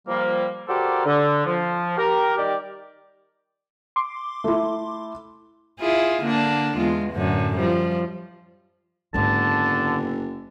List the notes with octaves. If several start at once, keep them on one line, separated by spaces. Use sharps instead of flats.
F3 G3 A#3
F#4 G4 A4 A#4 C5 D5
D3
F3
G4 A#4
D#3 G3 G4 D5
C6 D6
A3 E4
E4 F4 G#4
D3 A#3 D4
E2 G#3 F4
F#2 A2 D3
F3 G3
F#1 G#2 D3 B3 A5